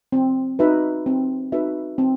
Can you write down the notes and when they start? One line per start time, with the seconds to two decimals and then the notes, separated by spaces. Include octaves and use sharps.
0.12 C4
0.59 D#4 F#4 B4 E5
1.06 C4
1.52 D#4 F#4 B4 E5
1.98 C4